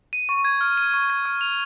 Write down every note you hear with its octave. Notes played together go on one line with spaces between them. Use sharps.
D#7
C#6
G#6
F6
D#7
C#6
G#6
F6
F7